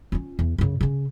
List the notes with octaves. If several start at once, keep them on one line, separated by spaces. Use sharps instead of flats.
C#4 F4
E2
F#2 C#3
C#3 C#4